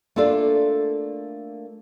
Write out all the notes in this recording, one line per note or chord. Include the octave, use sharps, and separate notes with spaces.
A3 A#3 D4 F4 A4 D5